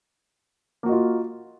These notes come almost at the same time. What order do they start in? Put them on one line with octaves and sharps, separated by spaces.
A#3 F#4 D#5 F4